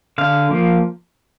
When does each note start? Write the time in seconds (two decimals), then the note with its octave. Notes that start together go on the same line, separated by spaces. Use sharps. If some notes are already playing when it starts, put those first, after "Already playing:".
0.18 D3 F5
0.51 F3 A#3